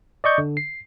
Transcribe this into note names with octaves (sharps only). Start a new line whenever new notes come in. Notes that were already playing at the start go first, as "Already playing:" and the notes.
D5 D#5 C#6 G6
D3
C7